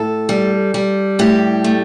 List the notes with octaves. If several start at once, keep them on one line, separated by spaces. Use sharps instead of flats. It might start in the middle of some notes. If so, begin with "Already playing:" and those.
Already playing: A2 A4
G3
G3
A2 G4
A3